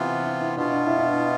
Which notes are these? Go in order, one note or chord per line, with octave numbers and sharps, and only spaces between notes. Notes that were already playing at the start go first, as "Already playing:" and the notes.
Already playing: C3 E3 B3 F4
E4
E4
B2 B3 D4 F4
D4
E4
E4
D4